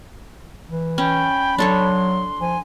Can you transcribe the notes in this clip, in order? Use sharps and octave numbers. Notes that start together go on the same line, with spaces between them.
E3
C#4 G5 B5
F#3 D4 A4 C#5 C6
F3 G#5